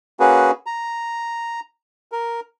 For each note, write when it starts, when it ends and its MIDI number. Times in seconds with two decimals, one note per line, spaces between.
0.20 0.51 58
0.20 0.51 61
0.20 0.51 66
0.20 0.51 68
0.20 0.51 71
0.66 1.60 82
2.12 2.40 70